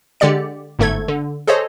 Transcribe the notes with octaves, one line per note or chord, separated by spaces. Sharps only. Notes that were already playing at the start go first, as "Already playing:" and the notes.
D3 G#3 G4 D5 C#7
G1 G#2 A3 A4 G#6
D3
G#4 A4 C5 C#5 D#5